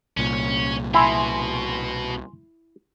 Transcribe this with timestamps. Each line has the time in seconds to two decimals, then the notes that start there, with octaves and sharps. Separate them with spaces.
0.17 C2 A#2 C#4
0.94 B2 E4 G#5 C6